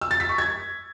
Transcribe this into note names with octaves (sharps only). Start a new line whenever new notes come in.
E6
A6
B6
C#6
G#6